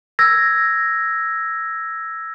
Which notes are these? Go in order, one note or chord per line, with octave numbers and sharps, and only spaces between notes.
E6 G#6 A#6